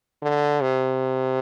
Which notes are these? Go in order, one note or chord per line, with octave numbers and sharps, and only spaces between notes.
D3
C3